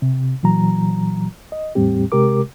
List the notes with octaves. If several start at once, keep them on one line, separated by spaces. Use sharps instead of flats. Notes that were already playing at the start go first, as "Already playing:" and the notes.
C3
A#2 E3 F#3 A#5
D#5
E2 A2 G3 C4 G4
C3 G#3 G4 A#4 D6